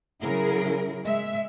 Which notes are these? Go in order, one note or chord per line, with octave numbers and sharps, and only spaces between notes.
C#3 F#3 E4 G#4 A#4
G#3 E5